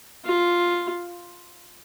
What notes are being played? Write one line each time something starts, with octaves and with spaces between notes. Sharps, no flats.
F4